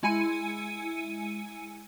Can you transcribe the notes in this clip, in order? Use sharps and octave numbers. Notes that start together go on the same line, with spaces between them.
G#3 E4 G#5 C#7 D#7